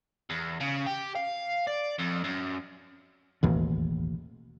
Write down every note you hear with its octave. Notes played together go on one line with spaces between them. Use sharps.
E2
C#3
G4
F5
D5
F2
F#2
E1 A1 D#2